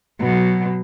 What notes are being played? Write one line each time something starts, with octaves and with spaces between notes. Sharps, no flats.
B2 F#3